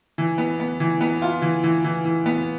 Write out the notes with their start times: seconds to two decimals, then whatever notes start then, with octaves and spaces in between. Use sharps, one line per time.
0.18 E3
0.38 B3
0.60 B3
0.80 E3
1.01 B3
1.22 F4
1.42 E3
1.64 E3
1.84 E3
2.05 E3
2.26 B3